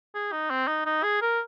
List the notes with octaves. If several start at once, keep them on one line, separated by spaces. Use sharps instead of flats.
G#4
D#4
C4
D#4
D#4
G#4
A#4